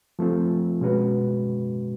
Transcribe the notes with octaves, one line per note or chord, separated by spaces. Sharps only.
F3 A3 C4 F4
B2 G#3 C#4 F#4 B4